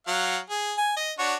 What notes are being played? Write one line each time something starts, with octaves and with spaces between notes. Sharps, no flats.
F#3 F5 F#5
G#4
G#5
D#5
D4 F#4 C#5